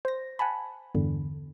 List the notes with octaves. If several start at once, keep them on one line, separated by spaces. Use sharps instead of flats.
C5 A#6
F#5 G#5 A5 B5
E2 G2 D3